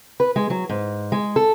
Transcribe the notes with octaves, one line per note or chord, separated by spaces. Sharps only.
B4
G#3
F#3
G#2
G#3
A4